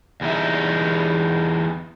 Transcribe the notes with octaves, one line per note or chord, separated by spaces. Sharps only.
E2 G3 D#4 E5